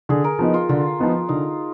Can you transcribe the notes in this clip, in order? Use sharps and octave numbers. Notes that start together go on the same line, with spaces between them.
D3 G#4
A#4
F3 B3 D#4
F4
D3 F4
F3 B3 D#4
D3 D#4